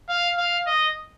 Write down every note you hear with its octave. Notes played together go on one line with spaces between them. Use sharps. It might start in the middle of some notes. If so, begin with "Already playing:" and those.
F5
F5
D#5